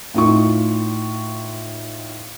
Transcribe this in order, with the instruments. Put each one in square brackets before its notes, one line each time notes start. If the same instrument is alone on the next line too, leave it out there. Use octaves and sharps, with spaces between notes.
[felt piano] A2 D#4 F4 C#6